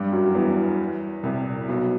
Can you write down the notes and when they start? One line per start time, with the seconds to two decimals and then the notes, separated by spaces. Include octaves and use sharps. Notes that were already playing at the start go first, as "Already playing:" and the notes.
Already playing: G2 G3
0.12 F#2 F#3
0.28 F#3
0.35 E2 E3
1.23 C2 C3
1.68 B1 B2